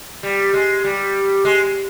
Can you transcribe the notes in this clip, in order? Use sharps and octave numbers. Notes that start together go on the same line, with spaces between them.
G3
G#3
G3
G#3